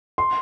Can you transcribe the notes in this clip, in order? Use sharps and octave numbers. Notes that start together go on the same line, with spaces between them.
C6